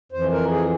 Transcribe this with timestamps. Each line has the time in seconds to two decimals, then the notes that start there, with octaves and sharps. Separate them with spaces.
0.12 F2 E3 C5
0.32 A#4
0.50 G#4